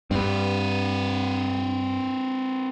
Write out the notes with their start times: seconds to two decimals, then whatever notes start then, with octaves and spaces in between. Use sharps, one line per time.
0.11 G2 C4 B4